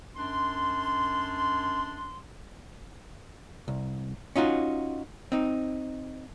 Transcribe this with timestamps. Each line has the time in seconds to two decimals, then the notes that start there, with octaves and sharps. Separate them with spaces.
0.16 F#2 D4 C6
3.68 C2
4.36 C#4 D#4 F4 F#4
5.32 C4 D#4